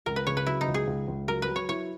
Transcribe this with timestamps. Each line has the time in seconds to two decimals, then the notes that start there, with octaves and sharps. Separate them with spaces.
0.06 C#2 A#4
0.16 B4
0.27 C#3 C#5
0.37 B4
0.46 F#3 E4
0.61 D#4
0.68 C#2
0.74 G#4
0.87 C#2
1.08 C#2
1.28 F#3 A#4
1.42 B4
1.49 F#3
1.56 C#5
1.68 E4 C#5